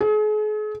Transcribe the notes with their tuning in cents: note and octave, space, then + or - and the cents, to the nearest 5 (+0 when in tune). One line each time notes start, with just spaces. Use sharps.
G#4 +40